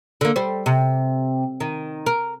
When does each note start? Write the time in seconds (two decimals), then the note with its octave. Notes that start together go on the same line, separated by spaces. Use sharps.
0.21 D3 A#3
0.36 G3 C5
0.66 C3
1.60 D#3
2.06 A#4